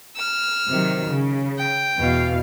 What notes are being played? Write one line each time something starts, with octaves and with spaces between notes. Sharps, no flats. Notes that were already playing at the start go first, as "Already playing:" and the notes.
E6 F6
C3 D#3 F#3
C#3
G5
E2 B2 F5